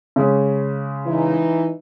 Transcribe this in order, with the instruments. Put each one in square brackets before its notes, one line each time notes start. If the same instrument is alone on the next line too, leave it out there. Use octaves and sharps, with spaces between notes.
[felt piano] C#3 G#3 C#4
[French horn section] E3 D#4